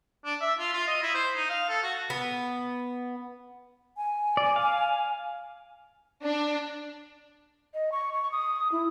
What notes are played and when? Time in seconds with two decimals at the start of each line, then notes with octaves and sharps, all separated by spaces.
0.25 D4
0.41 E5
0.59 F4
0.73 F4
0.87 D#5
1.02 E4
1.15 C5
1.35 D#4
1.50 F5
1.69 A4
1.83 F#4
2.10 B3
3.97 G#5
4.37 D5
4.56 F5
6.23 D4
7.73 D#5
7.92 C#6
8.13 C#6
8.32 D#6
8.72 E4